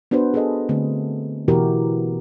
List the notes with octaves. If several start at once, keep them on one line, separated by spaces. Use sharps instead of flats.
B3 D4 F#4 B4 C5
G#4 A4 D#5
D3 A3 C4
B2 E3 E4 F#4 G4 A#4